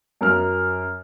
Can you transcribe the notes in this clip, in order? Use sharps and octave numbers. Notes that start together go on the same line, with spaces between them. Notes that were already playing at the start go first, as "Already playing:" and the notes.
F#2 A#4 F6